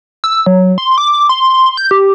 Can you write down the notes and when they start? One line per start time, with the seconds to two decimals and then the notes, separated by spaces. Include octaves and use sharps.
0.24 E6
0.46 F#3
0.78 C6
0.98 D6
1.29 C6
1.77 G6
1.91 G4